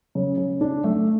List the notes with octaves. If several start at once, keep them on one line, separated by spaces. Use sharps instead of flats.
C#3
C#3
D4
A3